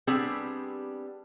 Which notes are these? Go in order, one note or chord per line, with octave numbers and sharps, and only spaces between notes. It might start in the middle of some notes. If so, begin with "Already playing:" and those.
G3 B3 C4 D4 G4 G#4